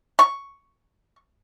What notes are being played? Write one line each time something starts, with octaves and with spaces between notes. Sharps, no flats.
C#6